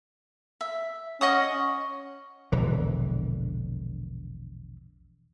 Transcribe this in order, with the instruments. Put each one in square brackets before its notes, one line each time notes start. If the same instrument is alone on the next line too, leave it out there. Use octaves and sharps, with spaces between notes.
[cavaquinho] E5
[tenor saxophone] C#4 [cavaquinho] D#5 F#5 D#6
[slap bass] E1 A#1 D3 E3